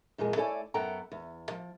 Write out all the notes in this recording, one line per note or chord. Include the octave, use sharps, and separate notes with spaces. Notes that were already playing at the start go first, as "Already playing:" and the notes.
F2 A#2 E3 G#3 G#4
A3 E4 A4 C#5 D5 G#5
F#2 B3 A4 F#5 G5 A#5
E2
F3